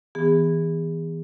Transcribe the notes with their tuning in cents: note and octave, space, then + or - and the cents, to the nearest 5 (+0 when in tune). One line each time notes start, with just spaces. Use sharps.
E3 -30 B3 +0 G#4 -35